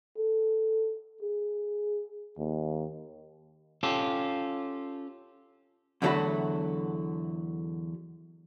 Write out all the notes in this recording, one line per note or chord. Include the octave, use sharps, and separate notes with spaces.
A4
G#4
D#2
C#4 F4 G4 A4
E2 D3 F#3 A3 F#4 B5